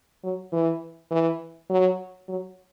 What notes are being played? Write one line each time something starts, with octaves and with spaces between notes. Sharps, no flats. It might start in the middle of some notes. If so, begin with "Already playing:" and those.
F#3
E3
E3
F#3
F#3